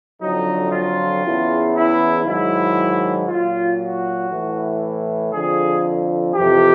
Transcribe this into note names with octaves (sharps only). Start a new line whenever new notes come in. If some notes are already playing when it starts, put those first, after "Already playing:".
F2 D3 F#3 D#4
F4
E2 C#3 E3
E4
G#2 D#3 F#3 E4
A#2 F#3 F4
F#4
A2 E3
F2 D3 F3 G#4
F2 C3 E3 G4